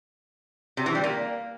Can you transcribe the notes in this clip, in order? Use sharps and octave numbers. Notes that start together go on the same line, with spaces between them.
C3
E3
G3
A#3